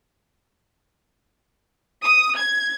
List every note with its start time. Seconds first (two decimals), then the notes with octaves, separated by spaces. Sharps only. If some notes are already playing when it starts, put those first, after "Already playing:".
2.04 D#6
2.38 G#6